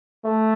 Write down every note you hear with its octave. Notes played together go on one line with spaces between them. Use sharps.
A3